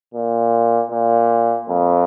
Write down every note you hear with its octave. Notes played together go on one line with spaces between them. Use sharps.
A#2
A#2
F2